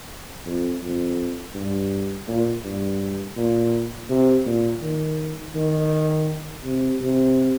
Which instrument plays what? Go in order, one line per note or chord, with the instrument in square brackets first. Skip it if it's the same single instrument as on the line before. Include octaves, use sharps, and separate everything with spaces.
[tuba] F2
F2
G2
A#2
G2
A#2
C3
A#2
D#3
D#3
C3
C3